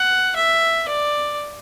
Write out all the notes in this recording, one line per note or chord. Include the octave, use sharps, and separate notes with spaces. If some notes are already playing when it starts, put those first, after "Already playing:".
Already playing: F#5
E5
D5